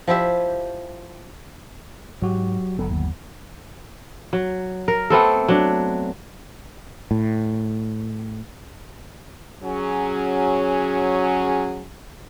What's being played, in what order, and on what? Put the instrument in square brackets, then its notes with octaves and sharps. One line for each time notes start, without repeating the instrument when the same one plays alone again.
[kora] F3 E4 G4 E5
[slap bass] G#2 [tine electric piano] F#3 F#4 G4
[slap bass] G1 F#3 B3 [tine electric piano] A4
[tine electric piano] D#2
[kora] F#3
A#4
A3 B3 C4 A4
F#3 D4
[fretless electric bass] A2
[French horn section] F#3 C#4 G#4